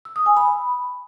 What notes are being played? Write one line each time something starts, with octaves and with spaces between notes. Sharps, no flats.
E6
D#6
G#5
B5